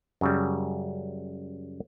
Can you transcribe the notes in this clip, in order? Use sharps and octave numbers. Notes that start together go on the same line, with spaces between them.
F#2 C#3 G3